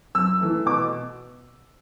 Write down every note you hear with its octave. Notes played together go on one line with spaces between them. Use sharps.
F#2 E6
E3 A3
B2 D6